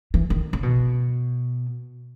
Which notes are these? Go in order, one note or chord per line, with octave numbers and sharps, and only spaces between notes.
E3
D#3
C#3
B2